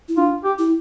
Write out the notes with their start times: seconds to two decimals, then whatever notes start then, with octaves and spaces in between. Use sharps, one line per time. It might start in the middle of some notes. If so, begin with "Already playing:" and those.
0.09 E4
0.17 D4 F4
0.44 G4
0.59 E4